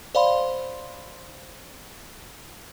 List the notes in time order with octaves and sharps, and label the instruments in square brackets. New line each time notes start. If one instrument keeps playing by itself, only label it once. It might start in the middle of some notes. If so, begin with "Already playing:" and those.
[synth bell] C5 D5 F5 B5 C6